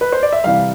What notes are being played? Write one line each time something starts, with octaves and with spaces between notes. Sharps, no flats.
B4
C5
D5
E5
C3 E3 G3 F5